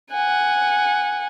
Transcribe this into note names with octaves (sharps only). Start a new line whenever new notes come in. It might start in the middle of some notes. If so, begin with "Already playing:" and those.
F#5 G#5